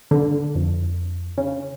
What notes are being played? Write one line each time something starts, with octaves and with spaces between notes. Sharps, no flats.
D3
F2
C#3